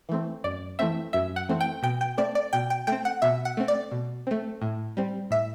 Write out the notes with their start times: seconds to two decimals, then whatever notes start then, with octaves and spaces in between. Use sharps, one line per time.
0.09 E3 A3 C4
0.44 F#2 D5
0.79 E3 A3 C4 E5
1.13 F#2 E5
1.36 F#5
1.49 E3 A3 C4
1.61 G5
1.83 B2 G5
2.01 G5
2.18 A3 C4 D5
2.35 D5
2.53 B2 G5
2.70 G5
2.87 A3 C4 G5
3.05 F#5
3.22 B2 E5
3.45 F#5
3.57 A3 C4
3.68 D5
3.91 B2
4.27 A3 C4
4.62 A2
4.97 G3 C4
5.31 A2 E5